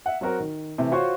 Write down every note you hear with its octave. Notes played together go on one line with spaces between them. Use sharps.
E5 F#5
F#3 C4 F#4 A#4
D#3
C3 E3 A3
F4 F#4 C5 C#5 C6 C#6